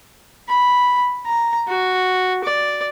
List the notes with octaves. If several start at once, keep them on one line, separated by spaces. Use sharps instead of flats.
B5
A#5
F#4
D5